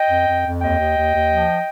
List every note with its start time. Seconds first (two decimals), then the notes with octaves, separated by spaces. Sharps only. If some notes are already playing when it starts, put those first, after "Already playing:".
Already playing: D#5 G5
0.10 F2
0.27 F2
0.45 F2
0.61 D#2 D#5 G5
0.79 D#2
0.97 D#2
1.14 D#2
1.30 F3